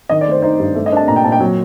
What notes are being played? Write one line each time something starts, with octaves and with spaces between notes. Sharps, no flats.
D#3 D#5
D5
A3 C5
D#4 C5
G2
A3
D#5
D4 A5
A#2 A#5
G5
A#2 A5
G5
F#3